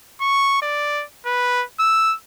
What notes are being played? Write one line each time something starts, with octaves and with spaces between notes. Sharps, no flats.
C#6
D5
B4
E6